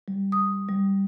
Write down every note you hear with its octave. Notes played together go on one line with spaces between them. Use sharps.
G3
D#6
G3